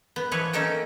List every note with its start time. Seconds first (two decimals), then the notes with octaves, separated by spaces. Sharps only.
0.16 B3
0.32 E3 F3 B4 C#5
0.53 A#3 C#4 D#4 A4 G5